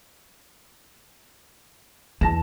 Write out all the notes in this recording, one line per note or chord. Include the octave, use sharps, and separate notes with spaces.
E2 A5 A#6 E7